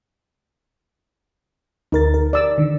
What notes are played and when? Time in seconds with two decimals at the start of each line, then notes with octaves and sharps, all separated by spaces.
1.92 D2 D#4 A#4 A6
2.14 A#4
2.33 D5 E6
2.58 D3 D#3